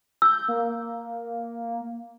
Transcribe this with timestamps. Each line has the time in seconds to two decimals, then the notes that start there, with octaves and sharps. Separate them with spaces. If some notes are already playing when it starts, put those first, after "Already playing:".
0.22 E6 G6
0.49 A#3